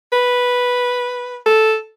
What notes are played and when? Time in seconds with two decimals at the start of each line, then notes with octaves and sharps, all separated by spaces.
0.13 B4
1.46 A4